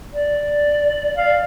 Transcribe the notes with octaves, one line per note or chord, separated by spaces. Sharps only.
D5
F5